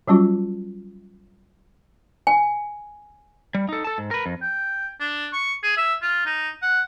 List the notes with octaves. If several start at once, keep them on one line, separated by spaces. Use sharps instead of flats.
F#3 G3 C#4 F4 F#4
G#5
G3
D#4 A4
A4 A5
G#2
A#4 B4
F2
G5
D4
C#6
G#4
E5
F4
D#4
F#5